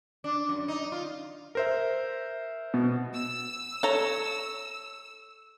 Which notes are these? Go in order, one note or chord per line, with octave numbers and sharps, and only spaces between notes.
D4
F#2
D#4
F4
A#4 C5 E5
B2 B3
E6
A4 C#5 A#5